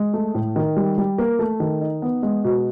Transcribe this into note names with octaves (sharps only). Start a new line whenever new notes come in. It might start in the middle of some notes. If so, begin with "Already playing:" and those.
Already playing: G#3
A3
A2
D#3
G3
G3
A#3
A3
D#3
D#4
B3
G#3
B2